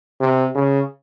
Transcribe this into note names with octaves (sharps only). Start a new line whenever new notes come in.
C3
C#3